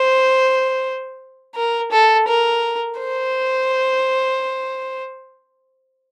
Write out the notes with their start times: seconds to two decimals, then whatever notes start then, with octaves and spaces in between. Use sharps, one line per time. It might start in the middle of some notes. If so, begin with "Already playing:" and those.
Already playing: C5
1.55 A#4
1.92 A4
2.28 A#4
3.00 C5